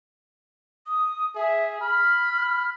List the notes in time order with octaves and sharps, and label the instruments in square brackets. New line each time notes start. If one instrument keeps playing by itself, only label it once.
[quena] D#6
[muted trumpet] G#4 [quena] E5
[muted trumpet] B5 [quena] F6